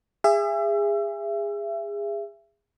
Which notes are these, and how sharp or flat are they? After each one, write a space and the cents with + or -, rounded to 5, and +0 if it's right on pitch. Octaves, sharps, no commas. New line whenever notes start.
G#4 -25 E5 +30